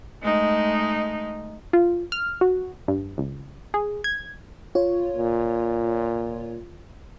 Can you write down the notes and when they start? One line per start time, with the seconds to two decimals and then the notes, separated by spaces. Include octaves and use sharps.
0.23 G#3 A3 D#4
1.73 F4
2.12 F6
2.41 F#4
2.88 G2
3.18 C#2
3.74 G#4
4.04 G#6
4.75 F4 C#5
5.16 A#2